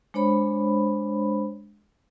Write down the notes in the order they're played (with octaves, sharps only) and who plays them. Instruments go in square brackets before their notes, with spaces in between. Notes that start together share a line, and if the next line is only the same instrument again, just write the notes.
[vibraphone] G#3 D4 C5 C#5 B5